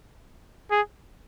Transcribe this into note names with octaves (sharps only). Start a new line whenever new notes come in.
G#4